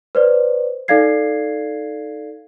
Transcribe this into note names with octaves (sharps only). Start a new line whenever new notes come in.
B4 C5 D5
D#4 A4 D5 F5 G#6 C7